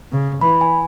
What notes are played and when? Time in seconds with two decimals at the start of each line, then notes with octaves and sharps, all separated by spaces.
0.12 C#3
0.41 E3 B5
0.61 G#5